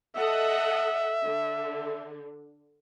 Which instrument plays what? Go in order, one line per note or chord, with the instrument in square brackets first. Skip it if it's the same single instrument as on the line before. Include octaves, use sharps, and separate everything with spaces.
[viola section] A4 D#5 F#5 [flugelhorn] E5
[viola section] D3